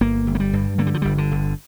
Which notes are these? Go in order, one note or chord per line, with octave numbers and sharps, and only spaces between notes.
G1 A#3
G1
A#3
G3
G2
D3 A#3
G3
F3
G1 G3
D3
G1